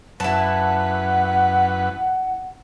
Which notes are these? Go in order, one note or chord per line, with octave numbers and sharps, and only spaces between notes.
F#2 E4 B4 F#5 A5